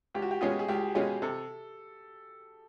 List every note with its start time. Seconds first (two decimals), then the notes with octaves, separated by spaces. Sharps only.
0.14 C#2 G4
0.22 F#4
0.31 G4
0.41 B2 G#3 C#4 F4 G#4
0.59 G#4
0.68 C#2 G4
0.95 B2 G#3 C#4 F4
1.22 C3 A4